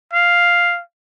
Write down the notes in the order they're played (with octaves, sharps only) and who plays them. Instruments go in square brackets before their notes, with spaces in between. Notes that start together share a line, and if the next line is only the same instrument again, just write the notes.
[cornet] F5